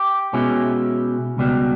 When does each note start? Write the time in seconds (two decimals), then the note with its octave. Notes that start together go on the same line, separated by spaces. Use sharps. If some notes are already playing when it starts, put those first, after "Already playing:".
Already playing: G4
0.33 B2 G#3 C#4 E4
1.37 C#2 B2 G3